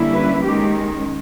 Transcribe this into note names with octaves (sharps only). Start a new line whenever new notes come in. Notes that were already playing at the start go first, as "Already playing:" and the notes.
Already playing: D3 G3 A#3 C#4 E4
B4
D#3 G#3 C#4 G4